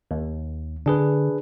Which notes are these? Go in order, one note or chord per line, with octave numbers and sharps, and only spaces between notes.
D#2
D3 D4 G#4 B4